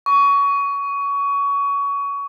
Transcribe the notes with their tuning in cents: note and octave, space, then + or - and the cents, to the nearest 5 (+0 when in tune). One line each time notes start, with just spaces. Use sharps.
C#6 +25